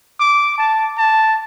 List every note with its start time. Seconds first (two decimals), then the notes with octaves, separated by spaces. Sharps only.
0.20 D6
0.58 A5
0.98 A5